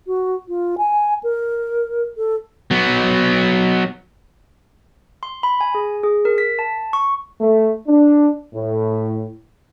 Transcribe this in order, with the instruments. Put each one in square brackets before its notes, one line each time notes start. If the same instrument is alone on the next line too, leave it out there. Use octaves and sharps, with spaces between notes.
[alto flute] F#4
F4
G#5
A#4
A4
[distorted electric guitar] F#3 B3
[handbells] C6
B5
G#5
G#4
G#4
A#4
B6
A5
C#6
[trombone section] A3
D4
A2